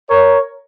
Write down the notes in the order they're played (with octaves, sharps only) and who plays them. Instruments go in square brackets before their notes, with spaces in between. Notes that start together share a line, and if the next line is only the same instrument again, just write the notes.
[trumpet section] A#4 C#5